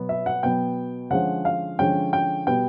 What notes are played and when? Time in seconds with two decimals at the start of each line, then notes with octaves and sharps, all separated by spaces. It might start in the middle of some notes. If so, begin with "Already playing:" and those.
Already playing: B2 F#3 B3
0.09 E5
0.26 F#5
0.43 B2 F#3 B3 G5
1.10 D3 F3 G#3 C#4 F#5
1.45 F5
1.79 D3 F3 G#3 C#4 G5
2.13 G5
2.47 B2 G3 B3 G5